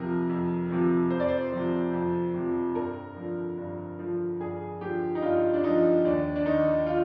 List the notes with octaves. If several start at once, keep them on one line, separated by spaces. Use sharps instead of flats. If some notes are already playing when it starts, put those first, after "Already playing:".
Already playing: F2 C3 F3 A#4
F2
C3 F3
F2 C5
D5
C5
C3 F3
F2
C3 F3
G2 A#4
D3 F3
G2
D3 F3
G2 G#4
D3 F3 G4
D#4
G2 F4
D4
D3 F3 D#4
D#2 D4
D4
D#3 D#4
F4